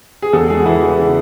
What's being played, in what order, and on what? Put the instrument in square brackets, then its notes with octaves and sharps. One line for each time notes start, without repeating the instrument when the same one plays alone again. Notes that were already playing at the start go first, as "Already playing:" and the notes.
[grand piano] G#4
E2 A4
G#3 G#4
F#4
E3 E4
E3 F#4
C#3